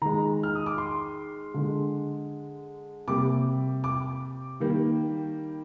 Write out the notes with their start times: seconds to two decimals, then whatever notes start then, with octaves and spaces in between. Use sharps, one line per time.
0.02 D#3 G#3 A#5
0.43 F6
0.55 D#6
0.66 D6
0.78 C6
1.54 D3 G#3
3.08 C3 G3 A#3 D6
3.84 D6
4.60 D#3 G3 A#3